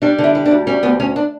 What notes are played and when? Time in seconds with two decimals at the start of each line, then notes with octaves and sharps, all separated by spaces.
0.02 G3 D4
0.18 D3
0.24 E4
0.35 G3
0.46 D4
0.51 D2
0.67 G3 C#4
0.83 D2 B3
1.00 D2 C#4
1.16 D4